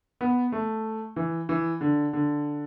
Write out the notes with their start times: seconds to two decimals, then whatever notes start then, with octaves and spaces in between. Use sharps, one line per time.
0.21 B3
0.52 A3
1.16 E3
1.49 E3
1.81 D3
2.13 D3